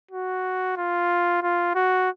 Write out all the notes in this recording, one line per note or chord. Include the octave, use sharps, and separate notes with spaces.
F#4
F4
F4
F#4